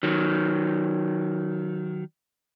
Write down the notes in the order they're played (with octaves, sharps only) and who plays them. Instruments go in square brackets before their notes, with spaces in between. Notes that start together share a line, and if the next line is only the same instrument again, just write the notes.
[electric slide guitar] D#3 F#3